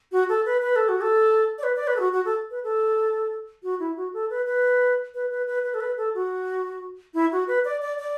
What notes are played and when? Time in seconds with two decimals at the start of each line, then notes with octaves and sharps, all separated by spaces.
0.12 F#4
0.29 A4
0.46 B4
0.62 B4
0.76 A4
0.89 F#4
1.01 A4
1.58 D5
1.63 B4
1.76 D5
1.87 B4
1.96 A4
2.00 F#4
2.12 F#4
2.25 A4
2.51 B4
2.64 A4
3.63 F#4
3.80 E4
3.96 F#4
4.14 A4
4.30 B4
4.46 B4
5.14 B4
5.31 B4
5.47 B4
5.64 B4
5.74 A4
5.80 B4
5.97 A4
6.15 F#4
7.14 E4
7.32 F#4
7.47 B4
7.65 D5
7.82 D5
7.99 D5